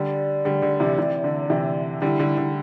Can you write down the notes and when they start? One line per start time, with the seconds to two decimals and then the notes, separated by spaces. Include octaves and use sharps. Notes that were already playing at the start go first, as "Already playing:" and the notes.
Already playing: D3 G3 D5
0.45 D3 G3
0.62 D3
0.80 C3 E3
0.98 C3 E3
1.24 D3
1.50 C3 E3
2.02 D3 G3 E4
2.19 D3 G3
2.37 D3